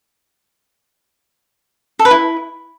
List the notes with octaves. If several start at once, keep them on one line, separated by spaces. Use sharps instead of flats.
A4
B4
E4